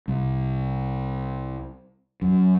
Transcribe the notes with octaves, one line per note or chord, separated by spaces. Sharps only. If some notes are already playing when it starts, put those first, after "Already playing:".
C2
F#2